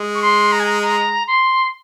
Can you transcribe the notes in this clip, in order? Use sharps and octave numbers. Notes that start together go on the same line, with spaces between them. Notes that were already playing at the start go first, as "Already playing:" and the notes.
Already playing: G#3
C#6
C6
A#5
G#5
A#5
A#5
C6